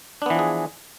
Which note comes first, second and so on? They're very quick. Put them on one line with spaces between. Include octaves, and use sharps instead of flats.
D4 B3 E3 F3 G#4